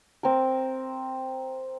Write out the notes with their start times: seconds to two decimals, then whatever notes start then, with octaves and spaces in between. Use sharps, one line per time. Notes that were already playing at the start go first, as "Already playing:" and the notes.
0.23 C4 A#4